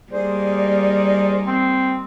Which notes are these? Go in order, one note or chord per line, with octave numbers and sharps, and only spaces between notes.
G3 A#3 D#4 G#4 C5 D5
C4